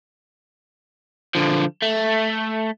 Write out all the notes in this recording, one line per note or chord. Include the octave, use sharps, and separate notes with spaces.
D3 F3
A3